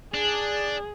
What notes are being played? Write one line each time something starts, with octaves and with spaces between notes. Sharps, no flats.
D4 G#4